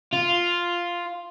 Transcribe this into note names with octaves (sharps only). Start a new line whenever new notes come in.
F4